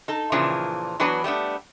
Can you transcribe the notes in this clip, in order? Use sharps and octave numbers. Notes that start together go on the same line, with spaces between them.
D#4 A4
A#2 C#3 E3 F3 D4
E3 F#3 B3 D4 F#4 B4
G3 A3 B3 D4